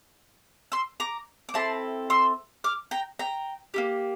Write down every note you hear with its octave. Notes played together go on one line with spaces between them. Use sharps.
C6 E6
A#5 D6
D6
C4 E4 A4 A5 C6
C6 E6
D6 F6
G5 A#5
G5 A#5
A#3 E4 G4